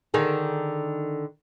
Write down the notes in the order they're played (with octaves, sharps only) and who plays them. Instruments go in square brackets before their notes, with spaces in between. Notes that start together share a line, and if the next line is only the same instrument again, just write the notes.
[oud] D3 D#3 G#4